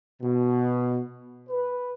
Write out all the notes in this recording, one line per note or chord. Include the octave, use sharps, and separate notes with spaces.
B2
B4